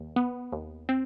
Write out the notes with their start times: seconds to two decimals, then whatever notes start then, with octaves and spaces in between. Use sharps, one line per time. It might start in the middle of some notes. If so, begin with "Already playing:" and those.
Already playing: D#2
0.16 B3
0.52 D#2
0.89 C4